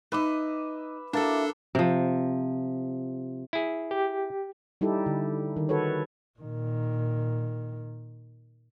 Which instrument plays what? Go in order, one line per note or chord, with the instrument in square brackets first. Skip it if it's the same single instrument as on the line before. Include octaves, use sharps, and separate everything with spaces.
[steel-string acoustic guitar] D#4 D#5 [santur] B4 E5 D6
[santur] A#3 A5 [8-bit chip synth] D4 A4 [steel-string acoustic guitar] E4 F#4
[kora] C3 F3
[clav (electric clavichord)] E4 G#4
[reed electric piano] G4
[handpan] G3 D#4 E4 G4 A4
D3
D#3
F#4 A4 B4 C#5
[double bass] A#2 D#3